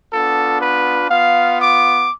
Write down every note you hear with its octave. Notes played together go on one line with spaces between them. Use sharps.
B3 D4 F4 A4
B4
B3 F4 F5
D6